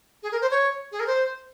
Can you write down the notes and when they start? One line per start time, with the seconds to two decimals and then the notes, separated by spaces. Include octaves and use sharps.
0.23 G#4
0.32 A#4
0.41 C5
0.51 C#5
0.92 G#4
1.00 A#4
1.07 C5